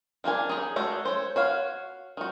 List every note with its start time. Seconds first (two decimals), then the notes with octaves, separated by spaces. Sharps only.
0.24 D#3 A#3 D4 G#5
0.49 D#4 G#4
0.76 G#3 A3 F#4
1.05 C5 C#5
1.36 F#4 C#5 F5
2.17 D#3 F#4